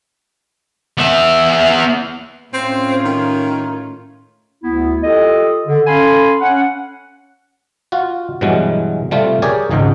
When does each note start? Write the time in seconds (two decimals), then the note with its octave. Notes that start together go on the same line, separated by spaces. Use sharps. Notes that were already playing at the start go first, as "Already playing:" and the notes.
0.98 B3 E5
2.53 A2 C4 C#4 F4
3.05 D#3
4.64 D2 B3 E4
5.02 F4 G4 A4 D#5
5.67 D3
5.87 C#4 A4 F5 G#5 B5 C6
6.41 C#4 F#5
7.92 F4 F#4
8.41 G2 B2 E3 F#3 G#3
9.11 C3 G3 A3 F4
9.42 G4 G#4 A#4 C#5 D5 G#5
9.71 G#1 C#2 G#2 D#5